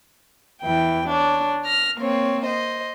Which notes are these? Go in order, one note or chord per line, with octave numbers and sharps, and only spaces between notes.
E2 E3 G5
D4 C#5
F6 A#6
A#3 C4 C#5
C5 D#5